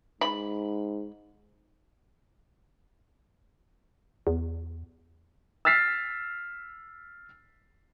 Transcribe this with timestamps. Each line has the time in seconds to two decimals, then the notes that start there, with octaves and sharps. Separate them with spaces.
0.21 G#2 B5
4.27 E2
5.65 E6 F6 A6 B6 C7